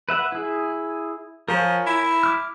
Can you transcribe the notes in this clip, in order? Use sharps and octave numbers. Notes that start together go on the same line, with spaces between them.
B4 E5 F#5
E4 G#4
F3 A#4 C#5 G#5
E4
D6 F6